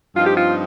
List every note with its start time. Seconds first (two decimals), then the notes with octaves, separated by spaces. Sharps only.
0.16 G2 F3 C4 D#4 F4
0.27 G4
0.37 F4